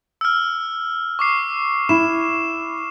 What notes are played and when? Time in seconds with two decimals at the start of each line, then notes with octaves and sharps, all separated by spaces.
0.21 E6 F6
1.19 C#6 D6 C7
1.89 E4 E7